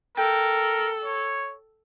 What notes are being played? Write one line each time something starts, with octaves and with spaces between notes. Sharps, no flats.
A4 A#4 G5
C#5